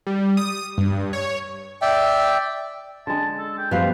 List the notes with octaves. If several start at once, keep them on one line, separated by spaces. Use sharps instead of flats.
G3
D#6
G2
C#5
D5 E5 G5
D3 G#3 A5
A4
G5
F#2 B2 F3 G3 B3 C4 B4 F5